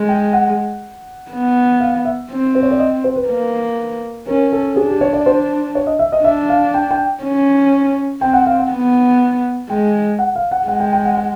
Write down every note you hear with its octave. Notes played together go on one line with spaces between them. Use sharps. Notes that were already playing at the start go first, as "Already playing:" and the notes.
Already playing: G#3
G5
F#5
B3
F5
E5
C4
C5
C#5
D5
D#5
C5
B4
A#3
C#4 A#4
A4
D4 G#4
G4
C#5
D5
C5
C#5
D#5
E5
D#5
D4 E5
F5
G5
G5
C#4
C4 G5
F#5
F5
F#5
B3
G#3 G5
F#5
F5
F#5
G#3 F#5
G5
G5
F#5
F#5